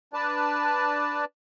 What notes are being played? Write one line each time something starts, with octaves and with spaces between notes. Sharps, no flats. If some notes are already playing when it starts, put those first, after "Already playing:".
D4 B4 D5 A5